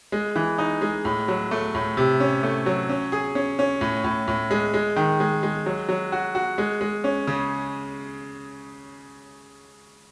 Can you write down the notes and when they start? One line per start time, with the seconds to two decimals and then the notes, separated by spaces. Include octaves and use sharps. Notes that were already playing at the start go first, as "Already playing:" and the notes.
0.12 G#3
0.36 E3
0.58 D#4
0.82 G#3
1.05 A2
1.28 F#3
1.51 A3
1.75 A2
1.97 C3
2.20 C#4
2.43 A3
2.66 F#3
2.89 C#4
3.12 G#4
3.35 C#4
3.59 C#4
3.81 A2
4.04 A2
4.28 A2
4.51 G#3
4.74 G#3
4.96 D#3
5.20 G#3
5.43 G#3
5.66 F#3
5.89 F#3
6.12 F#4
6.35 F#4
6.58 G#3
6.81 G#3
7.04 C#4
7.27 C#3